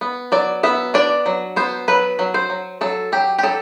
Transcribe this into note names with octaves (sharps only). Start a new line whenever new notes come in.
B3
F#3 D5
B3 E5
D4 D5
F#3
B3 C5
F#3 B4
F#3
C5
F#3
F#3 A4
F#3 G4
G4
F#3 A4